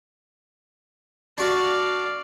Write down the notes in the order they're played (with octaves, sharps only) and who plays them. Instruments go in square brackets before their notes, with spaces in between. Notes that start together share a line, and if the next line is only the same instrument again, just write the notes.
[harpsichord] D4 F#4 [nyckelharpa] D5 F5